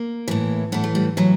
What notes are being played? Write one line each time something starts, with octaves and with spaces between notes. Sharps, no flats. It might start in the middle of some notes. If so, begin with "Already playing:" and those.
Already playing: A#3
A2 E3
A2 E3 B3
A3
G3
A2 E3 F#3